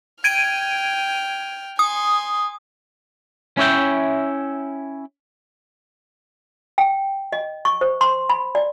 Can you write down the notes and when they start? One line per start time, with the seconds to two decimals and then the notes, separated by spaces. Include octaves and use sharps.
0.24 G5 F6 G#6 D7 D#7
1.79 G#5 C6 D#6
3.57 C#4 E4 C#5 E5 G5
6.78 G5
7.33 D#5
7.65 C#6
7.81 C5
8.01 C6
8.29 B5
8.55 D5